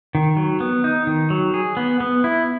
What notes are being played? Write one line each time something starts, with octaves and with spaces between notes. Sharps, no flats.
D#3
F#3
B3
D#4
D#3
F#3
G#4
B3
B3
E4